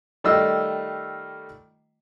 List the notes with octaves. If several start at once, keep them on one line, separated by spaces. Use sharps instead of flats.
D#3 G3 A3 F4 D#5 E6